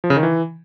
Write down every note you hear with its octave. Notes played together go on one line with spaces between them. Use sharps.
F3
C#3
D#3
E3